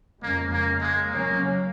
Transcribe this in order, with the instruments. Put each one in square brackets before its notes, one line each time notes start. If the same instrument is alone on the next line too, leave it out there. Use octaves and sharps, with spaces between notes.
[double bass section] F2 C#3 G#3 C#4 [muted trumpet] A#3
[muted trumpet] A#3
G#3
[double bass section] C#3 F#3 C#4 [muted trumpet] A#3